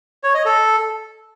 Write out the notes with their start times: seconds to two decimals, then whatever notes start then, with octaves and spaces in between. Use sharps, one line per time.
0.24 C#5
0.34 D#5
0.45 A4